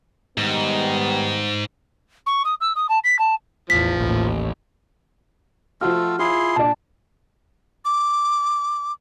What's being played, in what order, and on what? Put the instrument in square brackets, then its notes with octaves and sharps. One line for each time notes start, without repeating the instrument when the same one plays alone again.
[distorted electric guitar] G#2 [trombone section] D#3 G3 B3
[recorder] C#6
D#6
E6
D#6
A5
B6
A5
[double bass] A1 E2 [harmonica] F3 [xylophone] B6
[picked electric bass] A1 [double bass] D#2 A2
[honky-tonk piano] F3 F#4 [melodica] A3 F4 A4 [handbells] F6
[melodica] E4 G#4 C6 [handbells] F4
[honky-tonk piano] A#2 D4 [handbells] A5
[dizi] D6